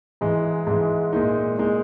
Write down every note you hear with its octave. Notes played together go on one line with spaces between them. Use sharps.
G#2 E3 G#3
G#2 E3 G#3
A#2 G#3 D#4
A#2 G#3 D#4